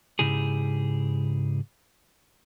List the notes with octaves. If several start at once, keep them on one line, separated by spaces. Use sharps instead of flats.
G#2 C#3 E4 G4 G#4